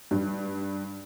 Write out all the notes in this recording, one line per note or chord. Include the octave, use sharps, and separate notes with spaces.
G2